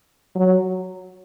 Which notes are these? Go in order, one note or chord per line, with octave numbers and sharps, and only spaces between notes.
F#3